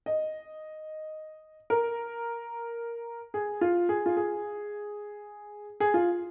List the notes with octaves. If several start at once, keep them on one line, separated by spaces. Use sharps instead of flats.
D#5
A#4
G#4
F4
G#4
F4
G#4
G#4
F4